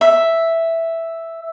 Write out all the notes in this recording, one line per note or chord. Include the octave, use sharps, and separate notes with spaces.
E5